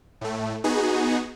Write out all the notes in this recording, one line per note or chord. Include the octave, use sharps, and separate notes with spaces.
A2 A3
B3 D#4 F#4 G#4